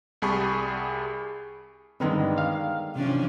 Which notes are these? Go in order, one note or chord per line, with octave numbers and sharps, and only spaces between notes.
C2 G3 G#4 A5 B5 C#6
G2 D3 D#3 G#3 B3
F5 F6
C3 E3 F3 C#4 D4